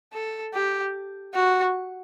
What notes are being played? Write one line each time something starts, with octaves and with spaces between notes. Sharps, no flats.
A4
G4
F#4